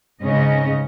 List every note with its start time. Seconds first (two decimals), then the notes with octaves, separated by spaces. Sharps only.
0.22 G#2 C#3 C#4 D#5